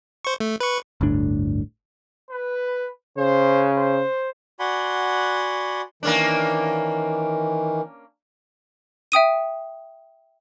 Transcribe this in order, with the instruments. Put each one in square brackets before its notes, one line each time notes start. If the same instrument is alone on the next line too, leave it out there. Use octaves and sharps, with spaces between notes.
[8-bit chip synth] C5 C#6
A3
B4 C#6
[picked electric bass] G1 D2 A2 D4
[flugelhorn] B4
[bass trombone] C#3 [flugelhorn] C5
[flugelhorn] C5
[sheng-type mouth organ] F#4 D5 F#5 G#5 B5 C6
[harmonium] D#3 E3 [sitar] A#3 C#4 D4
[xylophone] E5 G5 D#6 D#7